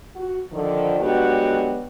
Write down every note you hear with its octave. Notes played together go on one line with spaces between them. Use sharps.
F#4
D3 D#3 F3
F#3 G#3 B3 D4 F#4 G4